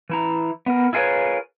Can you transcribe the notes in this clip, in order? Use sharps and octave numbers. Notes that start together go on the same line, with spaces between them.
E3 E4 A#5
B3 A#4
E4 F4 G#4 A#4 B4 C#5